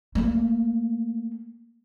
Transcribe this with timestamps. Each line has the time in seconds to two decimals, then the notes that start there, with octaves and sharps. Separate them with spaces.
0.15 A3 A#3